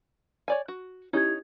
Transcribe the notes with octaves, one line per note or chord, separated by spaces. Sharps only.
C#5 D5 G#5
F#4
C#4 D#4 E4 G4 G#6